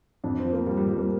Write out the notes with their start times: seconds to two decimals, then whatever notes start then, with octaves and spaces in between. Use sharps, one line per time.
0.24 F2 D4
0.38 C4
0.45 F3
0.52 A#3
0.66 F3 G3
0.77 G3
0.88 F3 G3
0.98 A#3